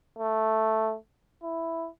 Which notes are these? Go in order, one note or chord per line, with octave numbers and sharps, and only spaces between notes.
A3
E4